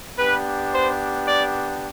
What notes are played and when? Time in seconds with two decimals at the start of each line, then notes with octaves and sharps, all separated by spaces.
0.18 B3 D4 G4 B4
0.72 C5
1.26 D5